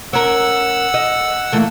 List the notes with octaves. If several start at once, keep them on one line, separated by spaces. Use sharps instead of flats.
C#4 A#4 F#5 E6
D#5
E3 A3 A#3